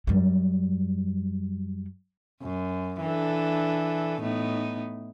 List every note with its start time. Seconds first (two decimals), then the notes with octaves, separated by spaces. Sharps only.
0.07 F#2 G3
2.42 F#2
3.01 E3 D4 A4
4.21 A2 B3 D#4